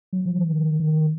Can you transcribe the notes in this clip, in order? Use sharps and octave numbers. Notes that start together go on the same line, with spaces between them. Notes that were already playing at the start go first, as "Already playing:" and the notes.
F#3
F3
E3
D#3
D#3